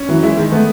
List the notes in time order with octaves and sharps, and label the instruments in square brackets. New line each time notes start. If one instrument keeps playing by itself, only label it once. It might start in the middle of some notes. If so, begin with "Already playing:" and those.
Already playing: [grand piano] C#4
[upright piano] E3 [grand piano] F#3
[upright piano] G#3 [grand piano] E4
[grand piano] D#3 [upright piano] G#3
[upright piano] A3 [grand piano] B3